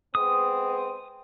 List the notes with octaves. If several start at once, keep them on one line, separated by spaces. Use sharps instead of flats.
G#3 B3 C4 D#6